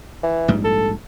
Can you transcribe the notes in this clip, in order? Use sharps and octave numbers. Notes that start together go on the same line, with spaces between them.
E3
A#1 G#2 G3
A4